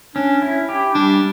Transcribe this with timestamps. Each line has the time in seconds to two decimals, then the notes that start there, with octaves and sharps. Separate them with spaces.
0.15 C#4 D4
0.42 E4
0.69 G4
0.95 G3 D4